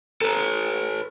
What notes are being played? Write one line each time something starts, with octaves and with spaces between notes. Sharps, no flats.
A4 B4